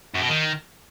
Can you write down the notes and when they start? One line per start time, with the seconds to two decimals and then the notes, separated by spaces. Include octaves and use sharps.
0.14 F#2
0.21 B2
0.29 D#3